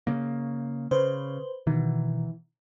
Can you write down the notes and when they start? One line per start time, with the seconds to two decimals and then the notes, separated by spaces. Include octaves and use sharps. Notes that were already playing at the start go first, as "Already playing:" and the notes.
0.07 C#3 A#3
0.91 C#3 B4 C5
1.67 B2 D#3 E3